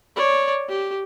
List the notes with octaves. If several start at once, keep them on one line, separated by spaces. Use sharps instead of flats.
C#5 D5
G4